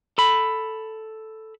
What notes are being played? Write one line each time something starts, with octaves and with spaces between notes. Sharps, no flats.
A4 B5